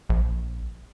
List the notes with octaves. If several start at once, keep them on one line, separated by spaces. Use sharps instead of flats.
A#1